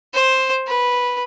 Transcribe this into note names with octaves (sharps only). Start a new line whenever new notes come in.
C5
B4